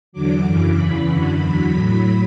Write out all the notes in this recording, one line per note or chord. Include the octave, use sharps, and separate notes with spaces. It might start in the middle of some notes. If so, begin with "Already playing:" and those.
E2 D3 F#3 D6
F#2 C#3 E3 D6
E2 C#3 E3 B5
F#2 D3 F#3
E2 D3 F#3
A2 F#3 B5